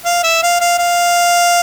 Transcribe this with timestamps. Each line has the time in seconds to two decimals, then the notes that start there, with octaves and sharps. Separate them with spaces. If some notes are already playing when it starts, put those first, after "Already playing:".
0.05 F5
0.24 E5
0.43 F5
0.61 F5
0.78 F5